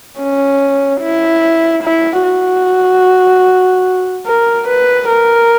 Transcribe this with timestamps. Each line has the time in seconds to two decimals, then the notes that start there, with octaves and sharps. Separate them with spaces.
0.19 C#4
1.02 E4
1.83 E4
2.23 F#4
4.27 A#4
4.68 B4
5.09 A#4